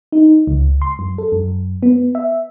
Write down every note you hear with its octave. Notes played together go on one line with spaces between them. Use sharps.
D#4
C#2
C6
F#2
A4
F#2
B3
E5